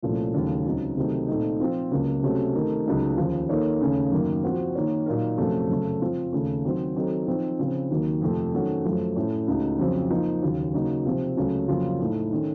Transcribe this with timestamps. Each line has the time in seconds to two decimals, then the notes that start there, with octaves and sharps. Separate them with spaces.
0.02 C2 A#2 F3 A3 C#4
0.34 D#2 C#3 F#3 A3
0.66 C#2 C#3 F#3 C4 D#4
0.97 C3 D#3 F#3 A3 D#4
1.28 A#2 A3 C4 D#4
1.60 F3 C4 F4
1.91 C#2 C#3 F#3 A#3 C#4
2.23 C3 F#3 A3 C#4 F#4
2.55 C3 D#3 A3 D#4 A#4
2.86 C#2 C#3 F#3 A3 D#4
3.17 D#2 C#3 F3
3.49 D#3 A#3 D#4 A4 C#5
3.80 D#2 C#3 A3 C#4
4.12 F#2 D#3 A#3
4.43 F3 C4 F#4 C5
4.75 D#3 A#3 D#4 A#4 C#5
5.06 A#2 F#3 A#3 D#4 A#4
5.38 F2 C3 F#3 A3 C#4
5.69 F#2 C#3 A3
6.01 F3 C4 F4
6.33 D#2 C#3 A3
6.64 D#3 F#3 C4 F#4 C5
6.96 D#3 F#3 C4 D#4 A4
7.27 F3 C4 D#4
7.59 C#3 F3 C4
7.90 D#2 D#3 F#3 A#3
8.21 F2 C3 F3 A3
8.53 D#3 F#3 A3 C#4 F#4
8.85 F#2 F3 A3
9.16 A2 A3 C#4
9.47 C#2 C#3 A3 D#4 F#4
9.79 F2 C#3 F#3 C4
10.10 F3 A#3 D#4
10.42 D#2 C#3 F#3
10.73 C#3 F#3 A#3 D#4 F#4
11.05 C3 F3 C4
11.36 C#2 C#3 F#3 A3 C#4
11.68 F2 C#3 F#3 A#3 F4
12.00 A2 A3 D#4
12.32 D#3 A3 C#4